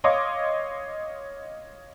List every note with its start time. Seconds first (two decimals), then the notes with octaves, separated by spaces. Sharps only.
0.04 C#5 D#5 F5 C6 D6 D#6